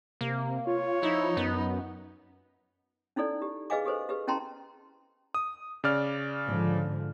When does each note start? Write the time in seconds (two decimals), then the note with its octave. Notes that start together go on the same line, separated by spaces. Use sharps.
0.21 C3 A#3
0.67 F4 C#5
1.03 F3 D#4 E4
1.37 F#2 B3
3.16 C#4 D#4 E4 A4 D5
3.42 G4
3.70 G#4 B4 D#5 F5 G#5 D6
3.86 G4 A4 B4 C5
4.09 G4 G#4 B4
4.27 C#4 E4 G5 A5 A#5 C6
5.34 D#6
5.84 C#3 D5 F6
6.47 G#2 D3 F3